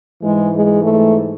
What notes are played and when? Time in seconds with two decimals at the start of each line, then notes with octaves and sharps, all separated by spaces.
0.23 G#2 E3 G#3
0.54 G#3
0.84 A3